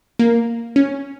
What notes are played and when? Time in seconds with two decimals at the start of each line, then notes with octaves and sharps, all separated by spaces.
0.19 A#3
0.76 C#4